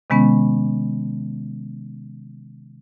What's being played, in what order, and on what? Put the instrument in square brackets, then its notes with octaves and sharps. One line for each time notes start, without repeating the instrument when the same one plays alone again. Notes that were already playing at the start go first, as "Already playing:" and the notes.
[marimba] C3 D#3 G#3 B3 C#4